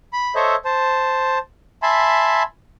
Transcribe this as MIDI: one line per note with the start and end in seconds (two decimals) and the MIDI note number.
0.13 0.35 83
0.35 0.56 69
0.35 0.56 72
0.35 0.56 73
0.35 0.56 75
0.35 0.56 76
0.65 1.38 72
0.65 1.38 81
1.82 2.43 76
1.82 2.43 80
1.82 2.43 81
1.82 2.43 83
1.82 2.43 84